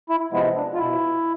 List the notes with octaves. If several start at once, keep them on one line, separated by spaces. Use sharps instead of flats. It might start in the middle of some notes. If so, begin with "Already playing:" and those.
E4
C3 F3 G#3 B3 E4
D4
F4
B2 E4